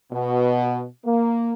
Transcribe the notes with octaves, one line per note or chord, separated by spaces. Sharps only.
B2
A#3